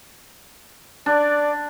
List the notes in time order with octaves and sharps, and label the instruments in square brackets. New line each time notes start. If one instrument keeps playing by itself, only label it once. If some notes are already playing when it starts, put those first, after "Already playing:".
[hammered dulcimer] D4 [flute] D5